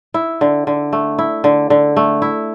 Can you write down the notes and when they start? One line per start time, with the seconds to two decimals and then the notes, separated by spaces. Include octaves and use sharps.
0.14 E4
0.41 D3
0.67 D3
0.93 A3
1.19 E4
1.44 D3
1.70 D3
1.97 A3
2.22 E4